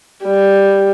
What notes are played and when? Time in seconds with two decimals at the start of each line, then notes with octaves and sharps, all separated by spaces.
0.25 G3